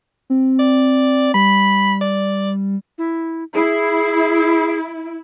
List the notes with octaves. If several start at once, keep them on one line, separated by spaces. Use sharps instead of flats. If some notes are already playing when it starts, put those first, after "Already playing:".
C4
D5
G3 B5
D5
E4
E4 G#4